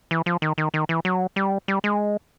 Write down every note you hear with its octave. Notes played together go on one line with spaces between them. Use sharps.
E3
F3
D#3
D#3
D#3
E3
F#3
G3
G3
G#3